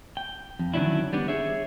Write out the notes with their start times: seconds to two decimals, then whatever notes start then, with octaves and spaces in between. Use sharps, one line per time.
0.17 G5
0.59 F2
0.74 D3 D#3 F#3 C#4 D4 E4
1.13 G3 B3 D4
1.28 G#4 C#5 E5